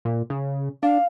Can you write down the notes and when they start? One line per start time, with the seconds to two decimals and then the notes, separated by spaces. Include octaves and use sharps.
0.05 A#2
0.30 C#3
0.83 D4 F5